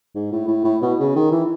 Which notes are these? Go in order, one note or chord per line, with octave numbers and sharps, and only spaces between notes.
G#2
A2
A2
A2
B2
C#3
D#3
E3